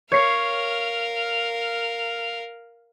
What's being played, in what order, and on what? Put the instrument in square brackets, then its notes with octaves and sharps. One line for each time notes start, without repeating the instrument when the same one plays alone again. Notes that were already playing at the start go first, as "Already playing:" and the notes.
[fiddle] A#4 F5 [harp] C#5 C7